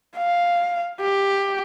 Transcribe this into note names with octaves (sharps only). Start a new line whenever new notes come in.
F5
G4